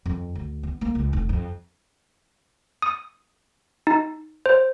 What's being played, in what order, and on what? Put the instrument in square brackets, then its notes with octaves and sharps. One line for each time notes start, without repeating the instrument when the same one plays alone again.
[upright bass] F2
D2
B3
A#3
C#2
F1
F2
[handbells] D#6
D#4
C5